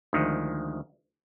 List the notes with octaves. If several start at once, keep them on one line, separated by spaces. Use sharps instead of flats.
D2 D#3 F3 G#3